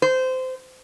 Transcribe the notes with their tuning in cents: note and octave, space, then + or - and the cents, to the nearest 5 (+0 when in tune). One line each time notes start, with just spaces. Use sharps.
C5 -20